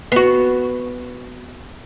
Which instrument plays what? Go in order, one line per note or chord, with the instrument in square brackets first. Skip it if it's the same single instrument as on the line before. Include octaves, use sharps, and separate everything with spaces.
[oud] B3 F#4